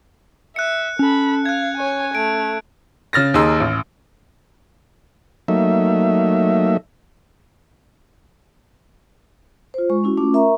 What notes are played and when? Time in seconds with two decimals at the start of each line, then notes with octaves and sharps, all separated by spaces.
0.56 E5 F#6 C#7
0.99 C#4 A4 B5
1.46 F5 F#6 G#6
1.77 C#5 G#5
2.15 A3 D7
3.13 C#3 F6 A6 A#6
3.34 D#2 D#4 G#4 C6 E6
3.60 A1
5.48 F#3 A3 A#3 D#4 E5
9.74 F4 C5
9.90 G#3 C#6
10.04 C#4 E4 F#4
10.18 A3 C#4 F4 D6
10.33 A#4 E5 A#5 C#6